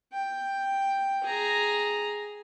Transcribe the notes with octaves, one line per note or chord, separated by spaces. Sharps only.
G5
G#4 A#5